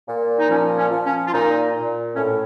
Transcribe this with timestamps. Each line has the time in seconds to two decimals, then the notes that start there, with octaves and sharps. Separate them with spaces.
0.08 A#2
0.39 D#4
0.49 F3 C#4
0.78 C#4
0.91 F3
1.05 C#4
1.27 F4
1.33 A#2 D#4
1.74 A#2
2.16 A2 C#4